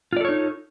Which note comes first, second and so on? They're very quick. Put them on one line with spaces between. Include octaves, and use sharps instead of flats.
F4 D5 A4 C#5 D#4